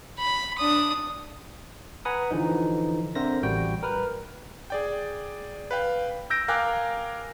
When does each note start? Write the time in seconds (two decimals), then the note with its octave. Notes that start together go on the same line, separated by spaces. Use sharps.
0.19 B5
0.58 D4 D#6
2.05 B4 F#5 G#5 A#5 B5 D#6
2.31 D3 E3 F3 D#4
3.15 D3 C4 A#4 C5 E5 A#6
3.43 A1 G3 F#4 G5
3.83 A#4 B4 F6
4.70 G#4 D5 G5
5.71 B4 F5 G5
6.30 E6 G6 A#6 D7
6.48 A#4 F5 G5 G#5 D6 F#6